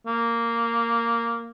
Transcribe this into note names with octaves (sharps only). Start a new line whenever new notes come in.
A#3